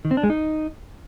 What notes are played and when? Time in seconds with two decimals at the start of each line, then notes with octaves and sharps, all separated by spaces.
0.05 D#3
0.11 C4
0.17 D4
0.23 G#3
0.30 D#4